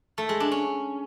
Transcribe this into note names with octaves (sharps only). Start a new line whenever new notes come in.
A3
G#3
D4
C#4